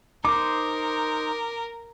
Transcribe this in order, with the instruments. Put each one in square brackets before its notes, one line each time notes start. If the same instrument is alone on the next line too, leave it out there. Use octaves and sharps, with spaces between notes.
[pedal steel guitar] D#4 C5 [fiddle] A#4 [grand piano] D6